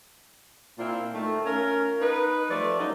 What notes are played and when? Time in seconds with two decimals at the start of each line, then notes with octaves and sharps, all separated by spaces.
0.79 A#2 C4 D4 E4 F4
1.13 D#3 A3
1.45 C#4 F4 A#4
2.00 D#4 B4
2.49 F3 G3 A3 A4 D5
2.78 F#3 G3 A#3 C#4 D#4